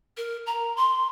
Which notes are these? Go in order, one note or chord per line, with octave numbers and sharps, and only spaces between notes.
A#4
A#5
C6